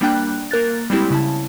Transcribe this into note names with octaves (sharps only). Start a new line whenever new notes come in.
G3 A#3 D4 G5 F#6
A#3 A#4 F#6 A6
G3 G#3 C4 E4 G4
C#3 E4 A5